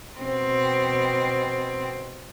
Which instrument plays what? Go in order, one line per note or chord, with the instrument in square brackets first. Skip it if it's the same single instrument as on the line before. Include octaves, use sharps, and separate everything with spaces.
[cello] B2 C4